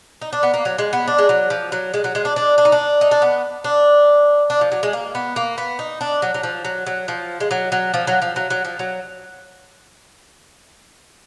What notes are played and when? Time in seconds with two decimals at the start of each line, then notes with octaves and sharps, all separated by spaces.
0.21 D#4
0.33 D4
0.43 B3
0.54 A#3
0.65 F#3
0.78 G#3
0.93 B3
1.08 D4
1.18 G#3
1.29 F#3
1.50 F3
1.72 F#3
1.94 G#3
2.04 F#3
2.15 G#3
2.25 D4
2.36 D4
2.58 D4
2.65 D#4
2.72 D4
3.01 D#4
3.11 D4
3.22 B3
3.64 D4
4.50 D4
4.61 F3
4.72 F#3
4.83 G#3
4.93 A#3
5.15 B3
5.36 A#3
5.58 B3
5.79 D#4
6.01 D4
6.22 F#3
6.34 F#3
6.43 F3
6.65 F#3
6.86 F#3
7.08 F3
7.40 G#3
7.51 F#3
7.72 F#3
7.94 F3
8.07 F#3
8.22 F3
8.36 F#3
8.50 F#3
8.65 F3
8.79 F#3